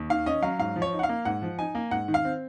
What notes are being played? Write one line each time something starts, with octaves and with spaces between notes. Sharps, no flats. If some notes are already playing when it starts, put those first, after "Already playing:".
Already playing: D#2
D#3 F5
C#4 D#5
F#3 F5
G#2 F5
F3
C#5
D#4
F#5
F5
A#3
G#2 F#5
F3
D#4 G#5
A#3
G#2 F#5
D#3
F5
C4